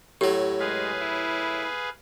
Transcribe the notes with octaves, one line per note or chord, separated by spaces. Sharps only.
A2 F#3 G4
G#3 G#4 B4 F5
E4